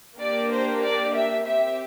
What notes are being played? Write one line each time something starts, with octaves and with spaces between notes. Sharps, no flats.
A#3 D4 G4 D5
C5
D5
E5
C4 G4 E5